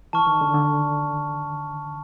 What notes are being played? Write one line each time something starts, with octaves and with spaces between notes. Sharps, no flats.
E3 A5 C#6 F6
D#3
D3
D3